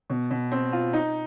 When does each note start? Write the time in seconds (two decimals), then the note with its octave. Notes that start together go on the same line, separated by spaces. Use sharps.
0.10 B2
0.30 B2
0.51 C4
0.73 F4
0.93 D#4